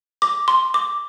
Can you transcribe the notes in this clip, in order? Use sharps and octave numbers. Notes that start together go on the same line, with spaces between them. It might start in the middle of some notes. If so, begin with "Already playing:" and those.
D6
C6
D6